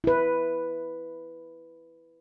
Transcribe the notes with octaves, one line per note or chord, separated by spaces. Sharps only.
E4 B4